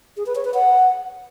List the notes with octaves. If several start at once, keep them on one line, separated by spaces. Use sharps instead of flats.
G#4
B4
C#5
B4
F#5